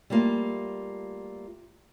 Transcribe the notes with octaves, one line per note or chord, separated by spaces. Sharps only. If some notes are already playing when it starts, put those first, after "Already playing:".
G3 A3 A#3 F4